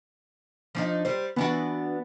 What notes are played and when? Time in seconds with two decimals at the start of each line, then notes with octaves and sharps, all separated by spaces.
0.75 F3 D4 D#4
1.05 G3 C5
1.36 E3 B3 D4 F#4